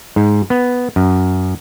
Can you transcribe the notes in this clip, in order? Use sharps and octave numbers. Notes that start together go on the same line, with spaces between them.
G#2
B3
F#2